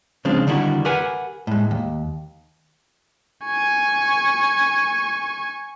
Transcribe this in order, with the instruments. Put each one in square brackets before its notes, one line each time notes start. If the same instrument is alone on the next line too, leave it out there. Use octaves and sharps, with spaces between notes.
[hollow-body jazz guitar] C#3 F3 G#3 C4 D4
D3 D#3 G3 E4 F#4
G4 A#4 B4 F#5 G#5
A2 G#3
D#2
[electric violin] G#5 C#6